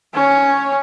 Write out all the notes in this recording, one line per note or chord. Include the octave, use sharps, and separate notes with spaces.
C#4 C#5